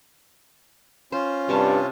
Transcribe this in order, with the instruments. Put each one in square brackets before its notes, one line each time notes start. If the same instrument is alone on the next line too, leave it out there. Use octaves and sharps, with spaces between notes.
[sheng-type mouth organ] C#4 F4 [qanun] C5
[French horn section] G2 [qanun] C3 C#5 A5